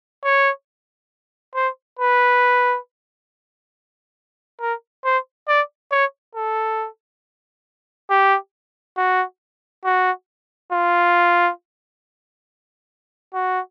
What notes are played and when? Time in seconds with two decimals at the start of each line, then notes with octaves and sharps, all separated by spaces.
0.24 C#5
1.55 C5
1.99 B4
4.61 A#4
5.05 C5
5.48 D5
5.92 C#5
6.35 A4
8.10 G4
8.97 F#4
9.85 F#4
10.72 F4
13.34 F#4